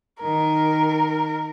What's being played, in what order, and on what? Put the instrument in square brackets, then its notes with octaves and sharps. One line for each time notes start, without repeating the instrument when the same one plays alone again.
[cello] D#3 [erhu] A#4